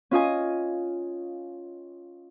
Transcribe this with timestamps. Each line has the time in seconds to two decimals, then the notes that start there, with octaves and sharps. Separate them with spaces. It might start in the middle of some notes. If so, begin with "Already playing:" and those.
0.11 C#4 F4 D#5 G#5